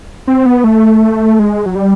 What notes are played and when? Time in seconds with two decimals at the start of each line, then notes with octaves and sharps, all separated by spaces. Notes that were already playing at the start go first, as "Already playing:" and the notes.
0.28 C4
0.46 B3
0.64 A3
1.39 G#3
1.66 F#3
1.75 G3